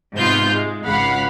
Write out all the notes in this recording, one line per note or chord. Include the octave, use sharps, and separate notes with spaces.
G#2 C3 B3 F4 G6
G#3
G#1 C#2 F5 F#5 B5